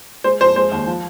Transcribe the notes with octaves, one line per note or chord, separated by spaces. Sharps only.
G#3 C5
F2 C5
G#3 C5
D#2
F3